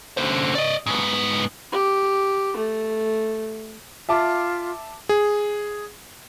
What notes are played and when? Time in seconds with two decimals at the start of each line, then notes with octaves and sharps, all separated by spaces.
0.17 D3 C5
0.55 D5 D#5
0.86 G#2 B3
1.72 G4
2.57 A3
4.09 F4 E5 A5 D6
5.09 G#4